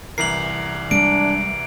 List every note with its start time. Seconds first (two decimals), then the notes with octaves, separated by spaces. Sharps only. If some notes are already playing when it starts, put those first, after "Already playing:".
0.18 C2 E3 A#4 C7 F#7
0.91 G3 G#3 D4 D7